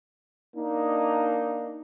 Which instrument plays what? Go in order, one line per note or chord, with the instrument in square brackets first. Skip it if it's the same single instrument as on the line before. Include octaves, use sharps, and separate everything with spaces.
[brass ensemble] A#3 D4 D#4